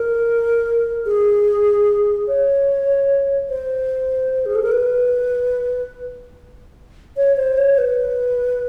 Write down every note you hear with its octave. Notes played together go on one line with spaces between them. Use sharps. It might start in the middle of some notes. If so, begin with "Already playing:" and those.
Already playing: A#4
G#4
C#5
C5
G#4
A4
A#4
B4
C#5
C5
C#5
B4